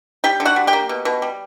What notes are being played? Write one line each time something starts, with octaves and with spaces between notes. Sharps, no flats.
G3 G4 G5
D3
F#4 F#5
G3
G4 G5
A#3
B2
B2
G3